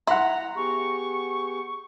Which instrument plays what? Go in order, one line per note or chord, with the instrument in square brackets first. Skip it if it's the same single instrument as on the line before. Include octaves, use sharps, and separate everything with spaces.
[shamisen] E4 [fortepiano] F#5 C6 [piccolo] A#5
[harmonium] B3 G4 G#4 [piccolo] C#6